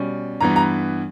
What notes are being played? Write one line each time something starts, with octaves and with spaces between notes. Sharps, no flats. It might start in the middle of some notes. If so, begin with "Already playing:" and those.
Already playing: B2 G3 C#4
G2 E3 B3 A#5
A#5